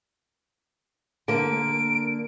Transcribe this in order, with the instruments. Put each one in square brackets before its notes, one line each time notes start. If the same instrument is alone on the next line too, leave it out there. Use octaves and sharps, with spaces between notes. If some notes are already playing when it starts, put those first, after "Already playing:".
[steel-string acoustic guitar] D3 A#3 [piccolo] D7